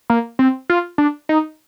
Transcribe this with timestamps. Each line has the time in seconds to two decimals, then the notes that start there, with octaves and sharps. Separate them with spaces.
0.10 A#3
0.39 C4
0.70 F4
0.98 D4
1.29 D#4